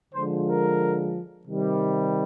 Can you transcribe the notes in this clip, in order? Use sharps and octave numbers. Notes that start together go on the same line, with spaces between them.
D3 F3 G#3 C5
A#4
C3 D#3 G3